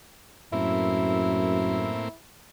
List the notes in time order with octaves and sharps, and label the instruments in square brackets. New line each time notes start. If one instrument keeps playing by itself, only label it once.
[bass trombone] F#2 [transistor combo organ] A2 A#3 C4 [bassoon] E4